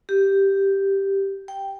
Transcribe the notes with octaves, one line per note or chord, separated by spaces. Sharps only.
G4
G5